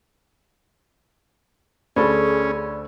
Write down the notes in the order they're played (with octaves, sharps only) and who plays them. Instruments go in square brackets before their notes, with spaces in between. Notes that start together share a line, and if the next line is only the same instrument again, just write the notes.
[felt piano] D2 A4 C#6 [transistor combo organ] C#4 [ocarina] G#4 [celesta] C5 D5 B5